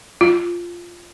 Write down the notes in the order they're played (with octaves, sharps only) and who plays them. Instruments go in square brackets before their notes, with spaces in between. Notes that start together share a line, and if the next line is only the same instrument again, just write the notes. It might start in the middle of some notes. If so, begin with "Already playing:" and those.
[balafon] F4